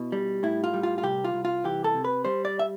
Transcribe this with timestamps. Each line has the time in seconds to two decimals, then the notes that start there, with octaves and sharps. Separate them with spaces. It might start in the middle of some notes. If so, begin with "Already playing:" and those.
Already playing: B2 E4
0.12 G3
0.43 A2 E4
0.64 F4
0.74 G3
0.83 F4
0.98 F4
1.03 C2 G4
1.24 F4
1.34 C2
1.45 F4
1.64 E3 G4
1.84 A4
1.94 C3
2.05 B4
2.25 G3 C5
2.45 D5
2.59 E5